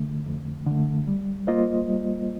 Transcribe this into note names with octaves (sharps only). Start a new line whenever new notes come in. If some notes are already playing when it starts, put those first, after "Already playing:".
Already playing: F2 D3 A3
F2
D3 A3
G3
A#3 F4 C5 D#5
G3